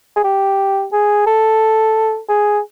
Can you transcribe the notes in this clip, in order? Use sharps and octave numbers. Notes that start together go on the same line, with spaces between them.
G#4
G4
G#4
A4
G#4